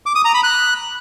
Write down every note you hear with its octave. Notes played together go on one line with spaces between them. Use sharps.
D6
D#6
A#5
B5
F#6